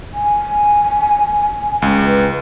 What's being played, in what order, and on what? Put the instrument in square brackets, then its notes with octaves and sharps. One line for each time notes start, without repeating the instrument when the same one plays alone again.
[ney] G#5
[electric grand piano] C#2
[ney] B4